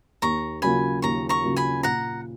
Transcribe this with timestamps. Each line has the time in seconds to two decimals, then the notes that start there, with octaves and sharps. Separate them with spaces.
0.22 D#2 A#5 C#6
0.62 C#3 F#3 A#3 F4 G#5 B5
1.02 D#2 A#5 C#6
1.29 A#5 C#6
1.43 C#3 F#3 A#3 F4
1.56 G#5 B5
1.83 A#2 F#5 A#5